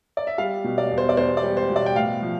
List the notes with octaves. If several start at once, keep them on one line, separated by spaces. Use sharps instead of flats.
D5
E5
G3 F5
B2
D5
E2
C5
D5
E2 C5
D5
G3
C5
B2
D5
G5
A2 F5
F3